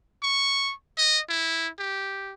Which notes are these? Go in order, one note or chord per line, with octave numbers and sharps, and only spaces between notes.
C#6
D#5
E4
G4